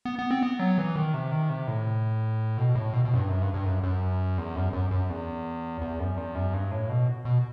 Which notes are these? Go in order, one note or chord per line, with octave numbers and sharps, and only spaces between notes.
B3
B3
C4
B3
F#3
E3
D#3
C3
D#3
C3
A2
B2
A2
B2
B2
F#2
G2
F#2
G2
G2
F#2
F#2
E2
F#2
F#2
F#2
E2
E2
F#2
E2
F#2
G2
A2
B2
B2